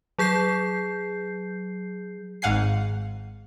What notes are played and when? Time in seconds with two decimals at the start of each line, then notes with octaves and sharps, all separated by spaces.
0.19 F#3 G#4 G6 C7
2.42 G#1 G#2 F5 F#5 G#5 C7